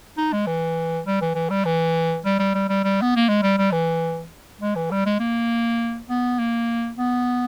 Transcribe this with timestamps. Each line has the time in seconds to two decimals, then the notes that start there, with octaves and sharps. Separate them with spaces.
0.17 D#4
0.33 G#3
0.47 E3
1.05 G3
1.21 E3
1.35 E3
1.50 G3
1.65 E3
2.25 G3
2.39 G3
2.54 G3
2.69 G3
2.84 G3
3.02 B3
3.16 A#3
3.29 G#3
3.42 G3
3.57 G3
3.72 E3
4.61 G#3
4.76 E3
4.91 G3
5.06 G#3
5.20 A#3
6.09 B3
6.39 A#3
6.97 B3